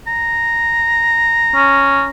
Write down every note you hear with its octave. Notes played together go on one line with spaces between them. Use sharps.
A#5
C#4